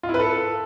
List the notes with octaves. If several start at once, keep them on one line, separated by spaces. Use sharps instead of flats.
F4
E4
B4
A4